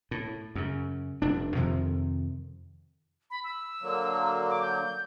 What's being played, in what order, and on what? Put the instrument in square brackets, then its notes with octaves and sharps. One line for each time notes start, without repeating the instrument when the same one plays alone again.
[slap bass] A2
F#2 C#3
F1 D4
F2 C3 D#3 F3
[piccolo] B5
E6
[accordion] D3 F#3 A#3
[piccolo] D6
G6